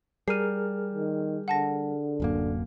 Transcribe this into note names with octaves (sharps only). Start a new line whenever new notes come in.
G3 G#4 A#4 F6 C7 D#7
D#3
D3 F#5 A5 A#6
D1 F#2 A#3